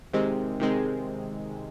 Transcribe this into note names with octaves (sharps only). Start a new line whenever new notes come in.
C3 D#3 G#3 C4
C3 D#3 G#3 C4